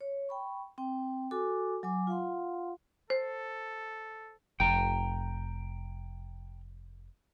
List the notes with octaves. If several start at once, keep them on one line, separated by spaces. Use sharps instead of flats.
C#5
G5 B5 C#6
C4 G5
F#4 A4 G#5 D6
F#3 G#5 D6
F4 F5 F#5 C6
A4 C5
F1 G5 A#5